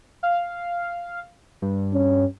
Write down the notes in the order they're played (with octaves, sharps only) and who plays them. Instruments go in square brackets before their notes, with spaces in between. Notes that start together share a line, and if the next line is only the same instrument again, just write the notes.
[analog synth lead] F5
G2
[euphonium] C#4